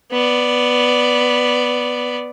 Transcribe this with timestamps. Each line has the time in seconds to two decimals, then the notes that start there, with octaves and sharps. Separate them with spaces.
0.12 B3 D5